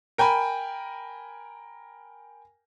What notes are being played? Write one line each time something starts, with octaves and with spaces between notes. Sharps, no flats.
A#4 G5 G#5 B5